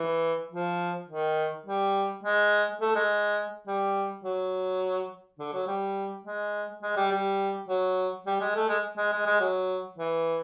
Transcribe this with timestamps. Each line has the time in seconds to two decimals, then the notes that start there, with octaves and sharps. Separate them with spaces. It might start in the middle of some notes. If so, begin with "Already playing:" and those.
Already playing: E3
0.51 F3
1.08 D#3
1.66 G3
2.24 G#3
2.81 A3
2.95 G#3
3.67 G3
4.24 F#3
5.39 D3
5.53 F#3
5.67 G3
6.25 G#3
6.83 G#3
6.96 G3
7.11 G3
7.68 F#3
8.26 G3
8.41 G#3
8.55 A3
8.69 G#3
8.97 G#3
9.12 G#3
9.26 G#3
9.40 F#3
9.98 E3